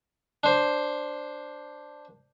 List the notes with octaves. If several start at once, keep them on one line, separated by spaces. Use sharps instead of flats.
D4 C5